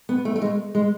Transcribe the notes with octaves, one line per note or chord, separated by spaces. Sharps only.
B3
A3
A3
G#3
G#3